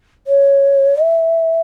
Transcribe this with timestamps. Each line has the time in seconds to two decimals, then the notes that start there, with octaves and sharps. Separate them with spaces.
0.27 C#5
1.01 E5